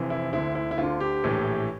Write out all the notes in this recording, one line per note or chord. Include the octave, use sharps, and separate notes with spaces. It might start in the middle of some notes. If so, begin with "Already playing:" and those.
Already playing: F1 F2 E3
E4
D2 D3 E4
E4
E4
D2 D3 F4
G4
A#1 A2 E3